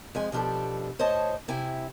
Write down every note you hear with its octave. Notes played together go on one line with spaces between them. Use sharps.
F2 G#3 G#5
B2 F3 D4 G4 A4
A2 C5 C#5 D#5 A5
C3 E4 G5 G#5